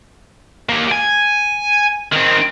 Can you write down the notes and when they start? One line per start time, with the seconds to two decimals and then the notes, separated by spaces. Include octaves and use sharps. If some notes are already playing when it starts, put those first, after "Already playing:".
0.69 A#3 G4
0.92 G#5
2.12 D#3 C4